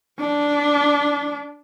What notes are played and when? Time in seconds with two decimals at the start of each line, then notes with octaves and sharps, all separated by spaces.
0.19 D4